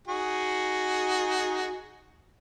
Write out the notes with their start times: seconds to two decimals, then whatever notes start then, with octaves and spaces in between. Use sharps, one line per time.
0.08 D#4 F#4 G#4